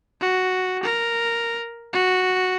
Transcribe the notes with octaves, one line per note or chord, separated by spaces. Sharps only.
F#4
A#4
F#4